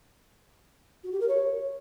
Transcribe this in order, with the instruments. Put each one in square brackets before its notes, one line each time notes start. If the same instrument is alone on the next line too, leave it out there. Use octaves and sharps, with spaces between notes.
[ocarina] F#4
G4
A#4
C#5